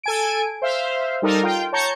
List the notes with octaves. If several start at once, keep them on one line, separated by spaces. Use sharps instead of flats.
A4 G#5 D7
C5 E5 F5
G3 D#4 A4 A#4
F4 G5
C#5 A5 A#5 C#6 G6 C#7